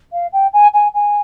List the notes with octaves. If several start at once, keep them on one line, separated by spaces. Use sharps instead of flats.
F5
G5
G#5
G#5
G#5